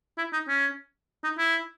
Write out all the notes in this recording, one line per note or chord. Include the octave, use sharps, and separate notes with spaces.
E4
D#4
C#4
D#4
E4